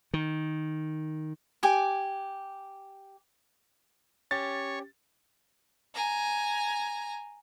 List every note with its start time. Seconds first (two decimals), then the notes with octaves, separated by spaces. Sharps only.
0.14 D#3
1.63 G4 G#5 D6
4.31 C#4 G4 C#5 A6
5.94 G#5 A#5